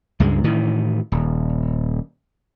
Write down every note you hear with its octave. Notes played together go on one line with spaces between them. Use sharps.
C#2 G2 G#3
A2 D#3 E3
D#1